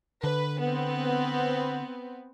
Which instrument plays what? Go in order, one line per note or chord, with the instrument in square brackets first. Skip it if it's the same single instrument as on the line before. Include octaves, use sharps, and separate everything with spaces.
[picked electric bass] D3 [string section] B4
[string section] B3 C4